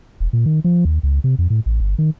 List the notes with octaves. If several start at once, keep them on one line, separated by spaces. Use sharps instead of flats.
E1
A#2
D#3
F3
D#2
C#2
C3
F2
A2
A1
G1
D#3